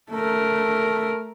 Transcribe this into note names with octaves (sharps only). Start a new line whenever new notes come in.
A3 A#4